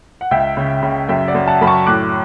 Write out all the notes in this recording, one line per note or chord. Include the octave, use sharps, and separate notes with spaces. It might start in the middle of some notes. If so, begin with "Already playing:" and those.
F#5
C#2 E5 G5
C#3
C#3
F#2 E5 G5
D5 F#5
F#2
F#5 A5
F#2 B5
A5 C#6
A2 D6 F#6